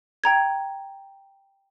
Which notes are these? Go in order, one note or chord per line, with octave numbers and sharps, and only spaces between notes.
G5 A#5 G#6